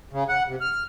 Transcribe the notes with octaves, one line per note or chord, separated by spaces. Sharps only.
C#3
F#5
C3
F6